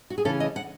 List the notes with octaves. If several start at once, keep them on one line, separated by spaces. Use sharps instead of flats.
F#4
G#4
C#3 E3 A3 C#4 A4
D#5
F#5